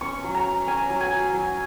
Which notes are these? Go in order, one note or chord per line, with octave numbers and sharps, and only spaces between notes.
C#4 C#6
F#3
A#5
C#4
C#4 G#5
F#3
G#5
F#3
F#3